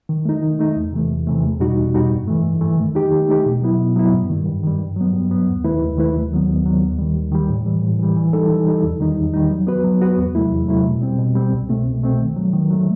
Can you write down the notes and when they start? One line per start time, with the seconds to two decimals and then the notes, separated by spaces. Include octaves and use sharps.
0.09 D#3
0.25 A3 D#4
0.42 D#3
0.59 A3 D#4
0.76 E2
0.92 C3 E3 A3
1.10 E2
1.27 C3 E3 A3
1.43 E2
1.60 B2 G3 D#4 F#4
1.77 E2
1.94 B2 G3 D#4 F#4
2.11 G2
2.28 E3 A3
2.44 G2
2.61 E3 A3
2.78 D#3
2.95 A3 D#4 G4
3.12 D#3
3.28 A3 D#4 G4
3.45 B2
3.62 F#3 B3 E4
3.79 B2
3.96 F#3 B3 E4
4.13 G2
4.29 D#3 G3
4.46 G2
4.63 D#3 G3
4.79 G2
4.96 F#3 B3
5.13 G2
5.30 F#3 B3
5.47 D#2
5.64 D#3 A3 E4 B4
5.81 D#2
5.97 D#3 A3 E4 B4
6.14 D#2
6.31 D#3 F#3 B3
6.48 D#2
6.65 D#3 F#3 B3
6.81 D#2
6.98 D#3 G3
7.15 D#2
7.32 D#3 G3
7.49 A2
7.65 E3 G3
7.83 A2
7.99 E3 G3
8.16 E3
8.33 G3 D#4 A4
8.49 E3
8.66 G3 D#4 A4
8.83 E2
9.00 D#3 G3 D#4
9.17 E2
9.34 D#3 G3 D#4
9.50 F#3
9.67 B3 F#4 B4
9.84 F#3
10.01 B3 F#4 B4
10.18 E2
10.35 C3 F#3 A3 E4
10.52 E2
10.68 C3 F#3 A3 E4
10.85 B2
11.01 G3 C4
11.19 B2
11.35 G3 C4
11.52 C2
11.69 B2 A3 C4
11.86 C2
12.03 B2 A3 C4
12.20 D#3
12.37 F#3 A3
12.53 D#3
12.70 F#3 A3